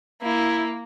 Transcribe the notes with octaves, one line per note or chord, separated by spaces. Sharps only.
A#3 E4